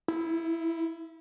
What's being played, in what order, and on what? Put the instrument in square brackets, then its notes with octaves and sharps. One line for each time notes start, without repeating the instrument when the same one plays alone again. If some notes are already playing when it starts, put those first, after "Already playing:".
[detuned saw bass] E4